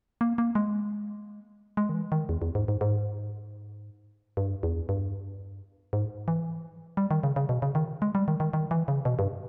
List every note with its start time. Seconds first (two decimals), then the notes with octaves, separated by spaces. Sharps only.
0.21 A#3
0.38 A#3
0.55 G#3
1.77 G#3
1.89 D#3
1.94 E3
2.12 D#3
2.29 E2
2.42 E2
2.55 G#2
2.68 G#2
2.81 G#2
4.37 G2
4.63 E2
4.89 G2
5.93 G#2
6.28 E3
6.97 G3
7.11 D#3
7.23 C#3
7.36 C#3
7.49 B2
7.62 C#3
7.75 D#3
8.02 G#3
8.15 G3
8.28 D#3
8.40 D#3
8.53 D#3
8.71 E3
8.88 C#3
9.05 B2
9.19 G2